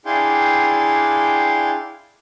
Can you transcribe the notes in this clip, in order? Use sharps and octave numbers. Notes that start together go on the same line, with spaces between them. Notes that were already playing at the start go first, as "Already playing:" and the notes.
D4 E4 G#4 F5 G5 C6